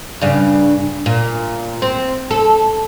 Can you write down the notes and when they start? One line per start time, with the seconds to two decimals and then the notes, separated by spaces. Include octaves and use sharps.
0.21 G2 C#3
1.06 A#2
1.82 C4
2.31 A4